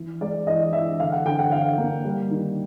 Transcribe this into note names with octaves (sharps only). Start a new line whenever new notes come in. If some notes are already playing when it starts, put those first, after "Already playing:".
Already playing: E3
G#3 D5
E3 D#5
E3 E5
D3 F5
F#5
D3 G5
F#5
D3 F5
A#3
G3
D#3